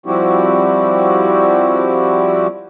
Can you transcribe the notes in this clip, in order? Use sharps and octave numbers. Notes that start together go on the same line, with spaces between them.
F3 G3 C4 E4 F#4 G4